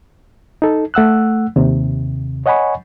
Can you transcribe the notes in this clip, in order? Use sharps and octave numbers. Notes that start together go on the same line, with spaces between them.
D#4 A4
A3 F#5 E6 F#6
D#2 C3
C#5 D#5 F#5 G#5 B5 C#6